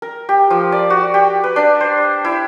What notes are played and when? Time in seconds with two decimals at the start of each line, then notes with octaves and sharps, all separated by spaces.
0.02 A#4
0.29 G4
0.50 F3
0.72 D5
0.90 F#4
1.14 G4
1.44 B4
1.56 D4
1.81 C5
2.25 E4